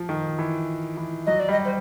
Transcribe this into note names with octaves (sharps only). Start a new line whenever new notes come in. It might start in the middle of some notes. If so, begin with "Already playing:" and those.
Already playing: F3
D#3
E3
E3
F#3 D#5
D5
G3 D#5
C5